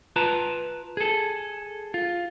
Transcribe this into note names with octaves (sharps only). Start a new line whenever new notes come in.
F4 B4 A5 A#5
G#4 A4
F4